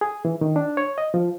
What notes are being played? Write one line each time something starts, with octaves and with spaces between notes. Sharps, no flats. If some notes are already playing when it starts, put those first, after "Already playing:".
G#4
E3
D#3
D4
C#5
D#5
F3